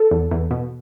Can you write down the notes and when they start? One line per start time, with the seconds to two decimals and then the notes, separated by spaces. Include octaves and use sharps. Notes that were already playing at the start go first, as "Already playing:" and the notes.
Already playing: A4
0.11 E2
0.31 E2
0.51 B2